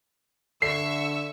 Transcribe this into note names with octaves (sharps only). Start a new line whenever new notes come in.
D3 E5 C#6 E6 C7